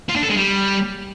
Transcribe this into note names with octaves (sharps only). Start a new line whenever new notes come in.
F4
D4
A4
G#3
G3